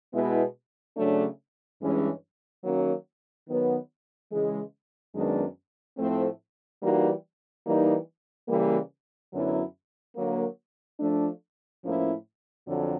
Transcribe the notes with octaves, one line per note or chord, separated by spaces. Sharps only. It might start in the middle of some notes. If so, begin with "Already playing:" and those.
B2 G#3 B3 E4
C#3 F#3 A3 D4
G2 E3 G#3 C#4
D#3 F#3 A#3 C#4 F#4
D#3 F#3 B3
C#3 E3 G#3
F#2 D#3 G#3 B3 D4
A2 F3 A3 C4
E3 G3 A#3 D#4 F#4
E3 G3 A#3 D#4
C#3 E3 G3 A#3
F#2 D3 F#3 B3 E4
D3 F#3 A#3
F3 A3 D4
A2 F3 A#3 C#4 E4
F2 D3 F#3